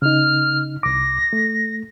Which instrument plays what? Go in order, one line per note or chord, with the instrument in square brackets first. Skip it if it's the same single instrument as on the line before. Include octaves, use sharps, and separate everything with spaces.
[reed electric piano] C#3 D#4 [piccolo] F6
[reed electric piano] C2 D6 [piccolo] A#6
[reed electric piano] A3